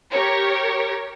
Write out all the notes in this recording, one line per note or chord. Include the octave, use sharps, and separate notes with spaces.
G4 A#4 C#5